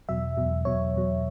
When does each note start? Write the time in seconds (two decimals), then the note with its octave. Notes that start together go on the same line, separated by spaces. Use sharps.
0.09 E2 B2 F#3 E5
0.37 E2 B2 F#3
0.65 E2 B2 F#3 C#5
0.94 E2 B2 F#3